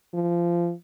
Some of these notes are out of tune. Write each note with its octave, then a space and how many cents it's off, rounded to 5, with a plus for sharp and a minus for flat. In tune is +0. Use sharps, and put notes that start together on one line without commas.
F3 -20